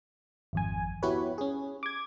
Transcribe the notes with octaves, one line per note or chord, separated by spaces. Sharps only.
G#1 F2 G#5
B3 E4 F#4 G4 B4 C#5
C#4 G#4
D6 G#6